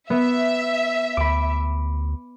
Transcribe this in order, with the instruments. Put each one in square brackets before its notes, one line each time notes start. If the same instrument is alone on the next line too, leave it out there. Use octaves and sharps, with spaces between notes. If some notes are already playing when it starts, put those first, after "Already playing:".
[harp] B3 [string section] E5
[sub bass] D2 [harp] B5 D6